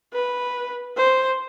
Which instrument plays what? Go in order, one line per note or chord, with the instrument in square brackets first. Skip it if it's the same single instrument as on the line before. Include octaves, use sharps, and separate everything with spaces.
[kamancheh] B4
C5